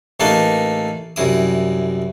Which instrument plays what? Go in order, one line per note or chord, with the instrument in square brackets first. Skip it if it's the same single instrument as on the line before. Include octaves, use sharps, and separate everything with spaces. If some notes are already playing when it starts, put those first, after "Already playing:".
[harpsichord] A1 A3 A#3 D#4 A4 B4
C2 F#2 E4 D#6